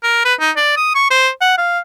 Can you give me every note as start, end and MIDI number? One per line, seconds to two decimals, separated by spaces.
0.03 0.21 70
0.25 0.34 71
0.40 0.51 63
0.56 0.74 74
0.77 0.91 87
0.95 1.07 85
1.11 1.29 72
1.41 1.55 78
1.58 1.79 77